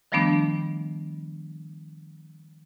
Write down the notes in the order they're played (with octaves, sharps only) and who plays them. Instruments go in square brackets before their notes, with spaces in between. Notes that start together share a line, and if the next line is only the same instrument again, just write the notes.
[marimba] D#3 F3 G3 A3 B3 D4